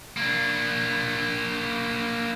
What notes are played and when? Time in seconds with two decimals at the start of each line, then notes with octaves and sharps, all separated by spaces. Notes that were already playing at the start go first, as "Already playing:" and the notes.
0.17 A#3 D4